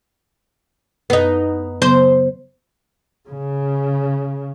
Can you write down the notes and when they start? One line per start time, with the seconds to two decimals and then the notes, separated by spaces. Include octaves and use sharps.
1.10 F#2 B3 D#4
1.82 C#3 F#3 B3 C5
3.28 C#3